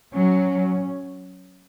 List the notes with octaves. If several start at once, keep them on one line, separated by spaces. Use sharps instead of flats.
F#3 C#4